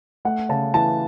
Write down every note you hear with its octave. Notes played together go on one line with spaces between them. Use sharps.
A3 F#5
C#3 A5
E3 A5